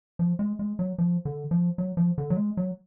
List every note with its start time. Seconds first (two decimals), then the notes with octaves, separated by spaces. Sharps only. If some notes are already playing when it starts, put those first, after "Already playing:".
0.19 F3
0.39 G#3
0.59 G#3
0.79 F#3
0.98 F3
1.25 D3
1.51 F3
1.78 F#3
1.97 F3
2.18 D3
2.30 F#3
2.37 G#3
2.57 F#3